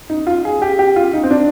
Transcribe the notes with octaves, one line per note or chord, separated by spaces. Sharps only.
D#4
F4
G#4
G4
G4
F4
D#4
C4
D4